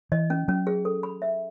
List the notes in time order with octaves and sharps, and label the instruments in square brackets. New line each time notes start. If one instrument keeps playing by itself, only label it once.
[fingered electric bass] E3 [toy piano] D#5
[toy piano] C#4
[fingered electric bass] F#3 [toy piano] C#4
[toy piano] G#4
A4
B5
E5